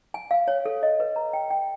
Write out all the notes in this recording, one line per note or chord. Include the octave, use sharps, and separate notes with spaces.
G#5
F5
C#5
A4
D#5
B4
A#5
G5
G5